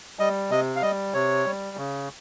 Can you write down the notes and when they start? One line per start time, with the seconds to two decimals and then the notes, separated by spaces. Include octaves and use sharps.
0.19 G3 D#5
0.50 C3 D#5
0.76 F5
0.82 G3 D#5
1.14 C3 C#5
1.46 G3
1.77 C#3